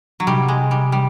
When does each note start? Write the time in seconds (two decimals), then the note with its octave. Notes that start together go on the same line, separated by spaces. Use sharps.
0.20 F#3
0.27 C3 G3
0.48 G#3
0.71 G3
0.92 G3